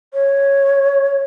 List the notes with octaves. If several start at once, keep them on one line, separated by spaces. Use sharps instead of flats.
C#5